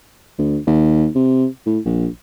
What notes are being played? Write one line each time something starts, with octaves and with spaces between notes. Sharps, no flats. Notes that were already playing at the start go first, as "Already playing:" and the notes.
D2
D#2
C3
A2
A#1